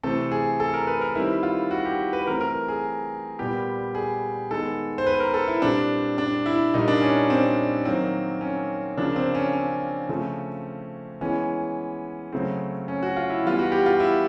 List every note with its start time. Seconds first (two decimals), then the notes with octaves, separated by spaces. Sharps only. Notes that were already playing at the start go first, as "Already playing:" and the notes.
0.03 C3 E3 A3 C4 A4
0.31 G#4
0.60 A4
0.74 A#4
0.87 B4
1.01 A#4
1.15 D#3 G3 C4 E4
1.43 F4
1.71 F#4
1.85 G4
2.13 B4
2.27 E3 A3 C4 A#4
2.41 A#4
2.68 G#4
3.39 A#2 G3 B3 G4
3.95 G#4
4.51 D#3 G#3 B3 A4
4.98 C5
5.06 B4
5.20 A#4
5.34 A4
5.48 E4
5.62 A#2 G3 C4 D4
6.18 D4
6.46 E4
6.74 A#2 G3 A#3 D#4
6.88 D4
7.01 C#4
7.30 C4
7.85 D#3 F#3 A#3 C4
8.41 C#4
8.97 C#3 F3 A#3 D4
9.16 C4
9.35 C#4
9.53 C#4
10.09 C#3 F3 A3 C4
11.21 E3 G#3 B3 C#4
12.33 C#3 F#3 A3 C4
12.88 C#4
13.03 F#4
13.16 F4
13.30 E4
13.44 E3 G3 B3 F4
13.59 F#4
13.72 G4
13.86 F4
14.00 E4